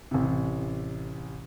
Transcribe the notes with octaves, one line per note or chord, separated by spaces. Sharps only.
A1 C3